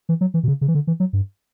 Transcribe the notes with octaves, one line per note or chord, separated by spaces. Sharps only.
E3
F#3
E3
B2
C#3
C#3
E3
D3
E3
F#3
G2